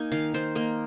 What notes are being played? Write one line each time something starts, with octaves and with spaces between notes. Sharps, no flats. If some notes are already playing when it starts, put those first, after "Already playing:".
Already playing: A#3 D#4 G#5
D#3 F5
D#3 C5
A#3 D#5